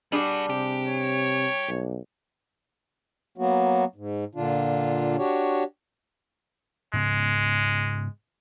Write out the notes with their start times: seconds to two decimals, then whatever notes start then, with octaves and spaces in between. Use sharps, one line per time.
0.12 G3 B3 D4 F#4 G#4
0.50 C3 G4
0.88 C#5
1.68 B1
3.38 F#3 A#3 B3 F#4
3.95 G#2
4.35 A#2 D3 D4 F4
5.18 D4 F#4 G4 C#5
6.93 G#2 C#3 G#3 B3